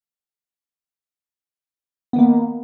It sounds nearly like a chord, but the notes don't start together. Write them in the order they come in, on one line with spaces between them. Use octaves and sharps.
B3 D#3 A#3